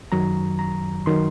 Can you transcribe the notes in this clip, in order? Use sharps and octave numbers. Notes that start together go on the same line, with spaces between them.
F#2 D#3 F#3 A#5
A#5
D#3 F#3 C6